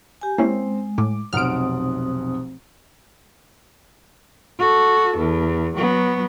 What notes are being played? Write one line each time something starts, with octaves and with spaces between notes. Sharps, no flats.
G4 G#5
G#3 A#3 C4 C#4 E4
A2 D6
F1 B1 C4 C5 F#5 D#6 F6 D7
F#4 A4
E2
F#3 B3